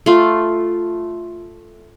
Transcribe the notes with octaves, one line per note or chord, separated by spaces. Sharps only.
A3 F4